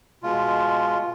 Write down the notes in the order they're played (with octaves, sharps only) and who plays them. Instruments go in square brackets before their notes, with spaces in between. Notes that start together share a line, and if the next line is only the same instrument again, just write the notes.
[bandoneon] B2 G#3 F4